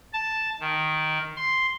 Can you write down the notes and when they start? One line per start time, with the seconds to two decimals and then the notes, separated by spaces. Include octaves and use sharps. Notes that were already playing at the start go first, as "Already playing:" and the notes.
0.13 A5
0.60 D#3
1.36 C6